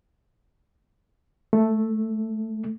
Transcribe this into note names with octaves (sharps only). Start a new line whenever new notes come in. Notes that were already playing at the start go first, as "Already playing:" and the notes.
A3